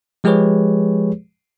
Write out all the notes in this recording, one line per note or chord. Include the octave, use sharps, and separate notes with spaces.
F3 G#3 G4 G#4 B4 C#5